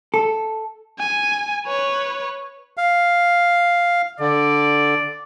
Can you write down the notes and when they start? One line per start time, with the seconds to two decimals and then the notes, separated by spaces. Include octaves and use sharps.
0.14 A4
0.99 G#5
1.66 B4 C#5
2.77 F5
4.20 D3 D5